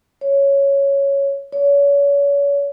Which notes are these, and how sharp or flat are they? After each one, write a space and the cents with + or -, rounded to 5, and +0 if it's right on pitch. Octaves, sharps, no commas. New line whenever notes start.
C#5 +0
C#5 +35